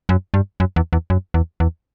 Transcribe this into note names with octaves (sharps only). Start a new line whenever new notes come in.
F#2
G2
F#2
E2
E2
F#2
E2
E2